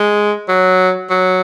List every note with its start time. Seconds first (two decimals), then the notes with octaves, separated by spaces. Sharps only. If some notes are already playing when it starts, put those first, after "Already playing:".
Already playing: G#3
0.48 F#3
1.10 F#3